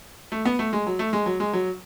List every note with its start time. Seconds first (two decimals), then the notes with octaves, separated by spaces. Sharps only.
0.32 A3
0.46 B3
0.59 A3
0.73 G#3
0.87 F#3
0.99 A3
1.13 G#3
1.26 F#3
1.40 G#3
1.53 F#3